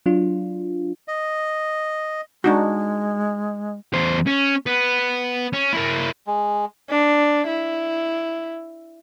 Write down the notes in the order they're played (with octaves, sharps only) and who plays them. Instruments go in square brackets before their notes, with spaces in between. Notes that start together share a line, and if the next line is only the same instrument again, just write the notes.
[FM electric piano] F#3 D4 F4
[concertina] D#5
[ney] G#3 [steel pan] D4 D#4 F#4
[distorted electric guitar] E2 C5
C#4
B3
C#4
A#3 E4
[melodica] G#3
[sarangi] D4
E4